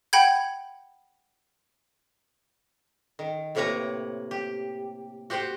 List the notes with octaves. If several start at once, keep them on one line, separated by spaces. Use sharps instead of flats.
F#5 G5 B5 G6 G#6
D#3
A2 C3 A#3 B4 C#5 A#5
G4
F#4 G4 C5 F#5 G5